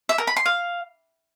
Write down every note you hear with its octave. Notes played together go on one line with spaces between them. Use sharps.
E5
A#4
B5
C6
F5